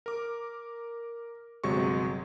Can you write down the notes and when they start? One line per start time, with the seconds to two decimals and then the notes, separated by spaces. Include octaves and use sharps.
0.06 A#4 D6
1.64 G1 C3 F#3 G#3 C#6